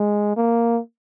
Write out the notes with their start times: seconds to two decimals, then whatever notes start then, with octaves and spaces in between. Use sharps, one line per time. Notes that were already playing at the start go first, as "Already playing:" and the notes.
Already playing: G#3
0.37 A#3